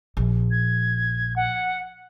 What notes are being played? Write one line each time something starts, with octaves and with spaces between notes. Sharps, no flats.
A#1
G#6
F#5